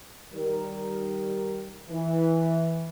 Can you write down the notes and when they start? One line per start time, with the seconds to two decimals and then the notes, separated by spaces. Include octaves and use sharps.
0.34 D#3 G3 A#4
1.90 E3